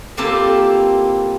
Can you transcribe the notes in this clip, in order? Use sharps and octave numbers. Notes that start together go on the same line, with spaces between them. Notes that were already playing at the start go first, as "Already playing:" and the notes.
A#3 C4 E4 F4 G4 A4